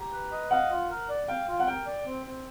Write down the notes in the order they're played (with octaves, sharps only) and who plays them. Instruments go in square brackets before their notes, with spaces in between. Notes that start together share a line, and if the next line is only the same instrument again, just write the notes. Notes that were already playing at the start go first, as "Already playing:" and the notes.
Already playing: [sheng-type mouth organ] G4 [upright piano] A#5
[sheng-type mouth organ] B4
D#5
[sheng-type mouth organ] F5 [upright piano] F#5
[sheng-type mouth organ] F4
A#4
D5
[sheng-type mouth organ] F5 [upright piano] G5
[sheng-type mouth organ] F4
[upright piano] F#5
[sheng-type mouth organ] A#4 [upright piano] G5
[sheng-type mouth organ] D5
C4
C4